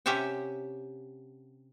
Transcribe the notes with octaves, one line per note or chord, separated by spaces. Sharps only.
C3 C#4 G4 E5 F#5 G5